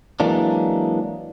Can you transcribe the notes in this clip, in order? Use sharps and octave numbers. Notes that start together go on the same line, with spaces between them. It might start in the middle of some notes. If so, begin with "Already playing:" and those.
E3 F#3 G#3 A#3 D4